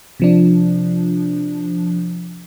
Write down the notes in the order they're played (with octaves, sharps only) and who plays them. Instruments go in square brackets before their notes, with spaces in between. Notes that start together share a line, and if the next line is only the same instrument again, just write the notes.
[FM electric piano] C3 F3 D4